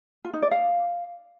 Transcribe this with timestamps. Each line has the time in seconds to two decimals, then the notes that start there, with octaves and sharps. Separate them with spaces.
0.25 F4
0.33 D#4
0.42 D5
0.51 F5